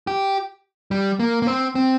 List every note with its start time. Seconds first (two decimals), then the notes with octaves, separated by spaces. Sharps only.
0.07 G4
0.91 G3
1.20 A#3
1.42 A#3
1.47 C4
1.75 C4